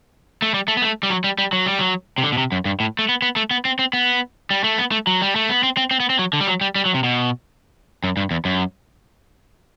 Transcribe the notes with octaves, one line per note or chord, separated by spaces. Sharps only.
A3
G3
A3
B3
A3
G3
F#3
G3
G3
F#3
G3
F#3
C3
D3
B2
C3
F#2
G2
A2
A3
B3
B3
A3
B3
C4
C4
B3
G3
A3
B3
A3
F#3
G3
A3
B3
C4
C4
C4
B3
C4
F#3
D3
G3
F#3
G3
G3
F#3
C3
B2
F#2
G2
E2
F#2